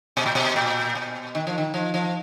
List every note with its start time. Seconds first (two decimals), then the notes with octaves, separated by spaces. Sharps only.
0.17 B2
0.26 A#2
0.35 B2
0.56 A#2
0.95 B2
1.35 D#3
1.47 F3
1.58 D#3
1.74 F3
1.94 F3